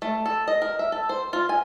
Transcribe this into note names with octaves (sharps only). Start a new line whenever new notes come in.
A3
A4
D#5
A#4
E5
A4
C5
F4
G#5